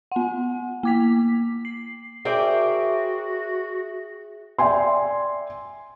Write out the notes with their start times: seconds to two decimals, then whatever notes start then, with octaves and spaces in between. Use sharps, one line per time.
0.12 B3 F#5
0.83 A#3 D6 B6
1.65 C7
2.25 F#4 G#4 A#4 C5 D5 E5 G5
4.58 D5 E5 G5 G#5 C6